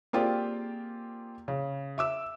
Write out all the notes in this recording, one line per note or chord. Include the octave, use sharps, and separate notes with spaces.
A#3 C4 F4 G4 G#4 D5
C#3
E5 D6 E6